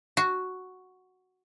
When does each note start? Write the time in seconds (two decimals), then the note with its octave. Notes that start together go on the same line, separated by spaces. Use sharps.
0.17 F#4